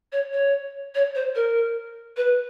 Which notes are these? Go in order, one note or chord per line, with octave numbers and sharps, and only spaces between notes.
C#5
C#5
C#5
C5
A#4
B4